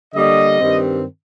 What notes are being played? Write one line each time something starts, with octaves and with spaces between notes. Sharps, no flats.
D3 G3 A#3 D#5
G2 D#3 G3 C4